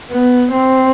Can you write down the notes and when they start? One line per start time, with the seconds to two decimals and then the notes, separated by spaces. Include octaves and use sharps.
0.10 B3
0.52 C4